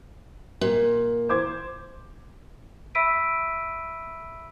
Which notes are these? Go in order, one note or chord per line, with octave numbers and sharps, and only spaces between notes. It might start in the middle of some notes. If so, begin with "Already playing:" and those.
A#2
C5 D6 G#6
E5 B5 E6 B6 D7 D#7